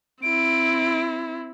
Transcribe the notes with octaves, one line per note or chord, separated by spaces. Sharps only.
C4 E4 D7